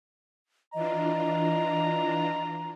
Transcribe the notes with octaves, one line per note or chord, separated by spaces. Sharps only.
E3 D4 F4 D#5 A#5